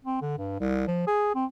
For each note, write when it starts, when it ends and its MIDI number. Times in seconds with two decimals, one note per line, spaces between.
0.05 0.21 60
0.21 0.38 50
0.38 0.57 43
0.60 0.83 36
0.87 1.07 53
1.07 1.33 68
1.35 1.45 60